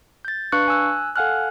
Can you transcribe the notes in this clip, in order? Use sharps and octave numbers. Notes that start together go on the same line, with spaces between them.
G6 A6
D4 B4 F5 C#6 F#6 C#7
G#5 E6 F#6
A4 F5 F#5 G#5 F6 F#6